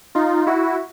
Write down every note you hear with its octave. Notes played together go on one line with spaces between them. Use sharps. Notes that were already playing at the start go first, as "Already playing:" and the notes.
D#4 F4
E4 F#4